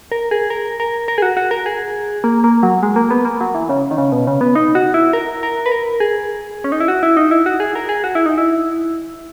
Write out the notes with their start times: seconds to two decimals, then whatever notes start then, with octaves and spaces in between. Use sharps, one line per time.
0.12 A#4
0.31 G#4
0.50 A#4
0.80 A#4
1.08 A#4
1.18 G#4
1.22 F#4
1.37 F#4
1.51 A#4
1.66 G#4
2.24 A#3
2.44 A#3
2.63 F#3
2.83 G#3
2.96 A#3
3.11 B3
3.25 A#3
3.41 F#3
3.55 E3
3.69 C#3
3.91 D#3
3.98 C#3
4.12 B2
4.27 C#3
4.41 B3
4.55 D#4
4.75 F#4
4.94 E4
5.13 A#4
5.43 A#4
5.66 B4
5.72 A#4
6.00 G#4
6.64 C#4
6.72 D#4
6.80 E4
6.88 F#4
7.03 E4
7.17 D#4
7.31 E4
7.46 F#4
7.60 G#4
7.75 A#4
7.89 G#4
8.04 F#4
8.15 E4
8.26 D#4
8.38 E4